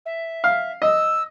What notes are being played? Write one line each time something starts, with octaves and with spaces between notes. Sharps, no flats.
E5
F5
D#5 E6